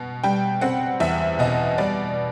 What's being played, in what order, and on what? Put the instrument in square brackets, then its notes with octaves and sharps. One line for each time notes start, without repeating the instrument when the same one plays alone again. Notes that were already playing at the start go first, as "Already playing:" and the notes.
Already playing: [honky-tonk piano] B2
G3 G5
C4 F#5
E2 E5
B2 D#5
G3 D5